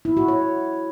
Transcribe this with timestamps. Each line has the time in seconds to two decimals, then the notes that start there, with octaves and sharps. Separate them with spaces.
0.05 E4
0.17 F#4
0.28 C#5